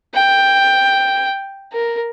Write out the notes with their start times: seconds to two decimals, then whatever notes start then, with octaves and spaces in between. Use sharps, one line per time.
0.15 G5
1.73 A#4